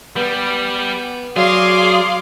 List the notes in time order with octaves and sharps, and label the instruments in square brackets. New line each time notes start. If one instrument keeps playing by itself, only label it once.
[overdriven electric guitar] G3 [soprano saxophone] B3
[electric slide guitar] F#3 [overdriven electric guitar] G#4 [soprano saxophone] D5 [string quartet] F5 C6 D6